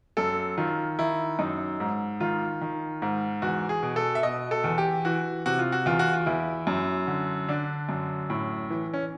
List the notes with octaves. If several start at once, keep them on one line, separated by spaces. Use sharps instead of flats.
F#2 A4
D#3 F4
D#3 E4
F#2 D#4
G#2
D#3 F4
D#3
G#2
E2 F#4
G#4
B2
A4
E5
B2 D#5
A4
E2
G4
E3 F#4
C3 F#4
F4
F#4
E2 F4
F#4
F4
E2 E4
F#2
D3
D3 D4
F#2
A2
E3
C#4